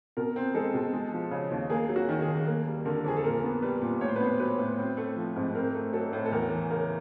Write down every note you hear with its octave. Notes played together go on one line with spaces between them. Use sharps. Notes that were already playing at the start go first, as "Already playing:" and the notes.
B2 A#4
C4
G#3 A4
B2
G#3
F3
C#3
D#2
A#3 G#4
F#3
F#4
D#3
G#4
D#2
A#3
G3
D3 A#4
F2 G#4
A4
A#2 A#4
B3
G3 B4
A#2
A2 C#5
C5
B4
B3 C5
F#3 B4
A2
C4
A3
F3
G#2
C4 A#4
A3
F#3 A4
A2
A4
E2 A#4
E3
C#3 A#4